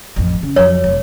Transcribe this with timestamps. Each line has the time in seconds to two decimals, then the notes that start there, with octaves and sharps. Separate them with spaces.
0.16 A1 F2
0.43 C#3
0.56 F2 F#3 C#5
0.84 E1